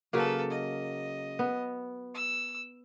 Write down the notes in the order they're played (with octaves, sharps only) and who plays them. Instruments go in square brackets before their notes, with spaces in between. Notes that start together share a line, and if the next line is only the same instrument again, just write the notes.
[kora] C#3 F#3 A#3 [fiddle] A4 B4
[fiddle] D#5
[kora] B3
[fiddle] E6